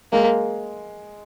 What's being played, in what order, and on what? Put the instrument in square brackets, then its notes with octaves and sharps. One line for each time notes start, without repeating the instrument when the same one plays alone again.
[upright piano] G#3 [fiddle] A#3